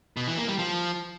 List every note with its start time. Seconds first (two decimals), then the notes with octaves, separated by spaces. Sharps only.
0.17 B2
0.27 E3
0.38 A#3
0.48 G3
0.59 F3